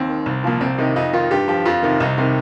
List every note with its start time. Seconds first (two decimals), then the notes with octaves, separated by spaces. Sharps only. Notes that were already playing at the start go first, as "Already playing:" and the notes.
Already playing: D#2 C4
0.09 D#3
0.26 C2
0.44 A#2 F3
0.61 C2 C4
0.78 C3 D#3 D#4
0.96 F2 D#4
1.13 D#3 F4
1.30 G2 G4
1.48 F3 G4
1.65 F2 F4
1.83 C3 D#3
2.00 C2 D#4
2.18 C3 D#3